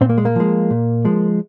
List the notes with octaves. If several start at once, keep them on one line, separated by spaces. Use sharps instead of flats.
A#2 C4
A#3
G#3
A#3
F3 G#3
A#2
F3 G#3